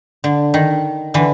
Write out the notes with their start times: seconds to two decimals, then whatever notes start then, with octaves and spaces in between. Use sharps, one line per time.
0.24 D3
0.54 D#3
1.14 D3 E3